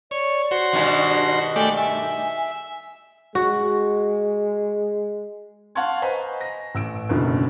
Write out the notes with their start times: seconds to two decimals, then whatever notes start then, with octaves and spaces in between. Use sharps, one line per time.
0.11 C#5 D5
0.51 F#4 C5
0.73 G2 B2 D#3
1.56 A3 D5 G5 G#5
1.77 E5 G#5
3.35 G#3 F#4
5.75 F5 F#5 A5 C6 C#6 G#6
6.02 B4 C5 D#5 G#5 A#5 C#6
6.41 A#6
6.75 A1 E6 D7
7.09 F#1 F#2 B2 D3 D#3